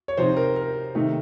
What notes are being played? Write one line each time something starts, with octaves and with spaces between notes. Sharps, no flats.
C#5
C3 F3 C4 D#4 C5
A#4
A#4
C3 D#3 A3 D#4